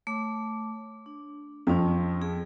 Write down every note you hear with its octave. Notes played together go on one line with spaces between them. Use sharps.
A3 C#5 D6
D4
F2 F3 C4 C#4
G#4